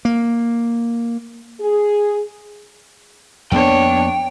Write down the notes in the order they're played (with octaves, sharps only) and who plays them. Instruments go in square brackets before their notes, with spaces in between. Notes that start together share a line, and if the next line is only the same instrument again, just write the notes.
[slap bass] A#3
[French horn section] G#4
[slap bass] F2 A#3 B3 [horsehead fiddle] D4 C#5 [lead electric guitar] G5